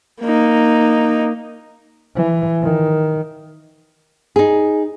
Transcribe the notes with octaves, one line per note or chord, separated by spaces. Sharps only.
A#3 D#4
E3
D#3
D#4 G#4